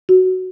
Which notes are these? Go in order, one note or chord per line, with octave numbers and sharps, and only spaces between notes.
F#4